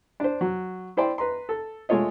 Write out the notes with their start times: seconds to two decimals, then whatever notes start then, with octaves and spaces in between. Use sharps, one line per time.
0.20 D4 C5
0.41 F#3
0.97 E4 C5 D5 G5 C6
1.18 B4 A#5 C6
1.49 A4
1.89 G#3 A3 F4 C#5 D#5